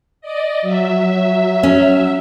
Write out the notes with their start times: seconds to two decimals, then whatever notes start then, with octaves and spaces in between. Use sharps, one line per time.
0.21 D5 D#5
0.62 F#3 E5
1.63 C#4